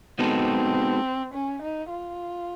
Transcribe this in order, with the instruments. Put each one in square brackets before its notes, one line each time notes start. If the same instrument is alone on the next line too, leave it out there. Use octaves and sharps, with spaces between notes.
[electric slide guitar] G#3 B3 D#4 F#4 A4 [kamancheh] C4
[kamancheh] C#4
D#4
F4